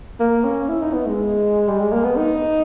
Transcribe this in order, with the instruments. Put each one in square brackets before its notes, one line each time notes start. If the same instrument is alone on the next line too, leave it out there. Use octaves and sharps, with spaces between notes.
[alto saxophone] A#3
C#4
E4
D#4
B3
G#3
G3
G#3
A#3
B3
D#4